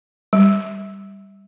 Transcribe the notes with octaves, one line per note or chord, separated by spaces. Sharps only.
G3